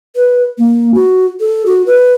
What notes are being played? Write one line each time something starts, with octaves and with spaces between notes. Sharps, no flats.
B4
A#3
F#4
A4
F#4
B4